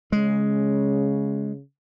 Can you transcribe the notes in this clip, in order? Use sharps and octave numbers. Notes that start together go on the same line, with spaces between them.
C#3 G#3